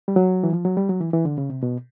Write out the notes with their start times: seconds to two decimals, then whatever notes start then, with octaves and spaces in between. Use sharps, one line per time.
0.08 G3
0.16 F#3
0.44 E3
0.53 F3
0.65 F#3
0.77 G3
0.89 F#3
1.01 E3
1.13 E3
1.25 D3
1.38 C#3
1.50 C3
1.63 B2